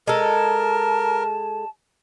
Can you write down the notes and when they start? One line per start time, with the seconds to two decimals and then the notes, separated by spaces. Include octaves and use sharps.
0.07 G#3 A4 A#4 A5